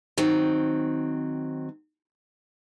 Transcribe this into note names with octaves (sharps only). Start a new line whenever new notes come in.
D#3 F#3 C4